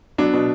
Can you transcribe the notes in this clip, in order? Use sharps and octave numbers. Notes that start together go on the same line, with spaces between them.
F#3 B3 D4
B2